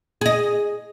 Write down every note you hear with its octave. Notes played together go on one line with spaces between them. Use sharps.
G#4 D#5